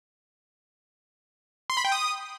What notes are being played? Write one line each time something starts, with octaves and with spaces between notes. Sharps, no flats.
C6
B5
G5
D#6